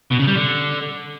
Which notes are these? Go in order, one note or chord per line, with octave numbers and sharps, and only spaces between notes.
B2
C#3
G3
D3